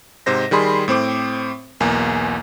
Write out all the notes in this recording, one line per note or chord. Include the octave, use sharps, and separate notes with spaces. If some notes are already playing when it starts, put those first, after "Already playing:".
G#2 C3 C5 A#6
D#3 G3 G#4 B5 C6
A2 C4 C5 D6
B1 E2 A#3 G#5